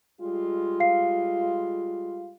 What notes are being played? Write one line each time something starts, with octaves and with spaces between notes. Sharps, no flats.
G3 G#3 F4
F5 C7